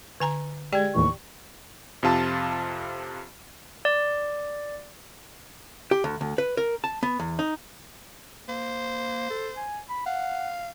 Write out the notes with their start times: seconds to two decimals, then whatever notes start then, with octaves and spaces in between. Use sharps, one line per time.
0.20 D3 G#5 A#5
0.72 G#3 G4 D5 G5 G#6
0.95 D#2 A2 E3 C#6
2.03 F2 C3 F4 A5
3.85 D5
5.91 G4
6.04 D2
6.21 D2
6.38 B4
6.57 A#4
6.84 A5
7.03 B3
7.20 E2
7.39 D#4
8.49 A#3 C5
9.30 A4
9.57 G#5
9.90 B5
10.06 F5 F#5